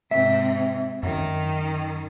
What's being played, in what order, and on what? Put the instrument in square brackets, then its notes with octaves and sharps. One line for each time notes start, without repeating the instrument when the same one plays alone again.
[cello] G#2 C3 [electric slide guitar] E5
[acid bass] F#2 [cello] D#3